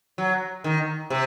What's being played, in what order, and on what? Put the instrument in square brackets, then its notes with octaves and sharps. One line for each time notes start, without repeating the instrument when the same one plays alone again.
[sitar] F#3
D#3
C3